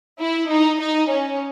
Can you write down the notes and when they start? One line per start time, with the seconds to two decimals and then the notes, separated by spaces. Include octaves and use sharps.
0.19 E4
0.50 D#4
0.80 D#4
1.09 C#4